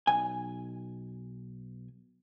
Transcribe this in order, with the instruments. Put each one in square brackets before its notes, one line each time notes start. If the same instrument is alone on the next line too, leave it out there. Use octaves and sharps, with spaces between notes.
[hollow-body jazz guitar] B1 G#5